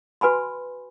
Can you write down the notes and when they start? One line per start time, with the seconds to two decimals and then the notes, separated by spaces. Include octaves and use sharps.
0.21 F#4 B4 G#5 B5 C6